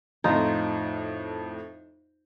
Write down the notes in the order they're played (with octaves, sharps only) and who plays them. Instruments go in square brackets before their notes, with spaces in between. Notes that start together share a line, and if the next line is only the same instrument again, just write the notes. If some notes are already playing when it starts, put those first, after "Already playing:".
[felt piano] F2 A2 [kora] D#4 F4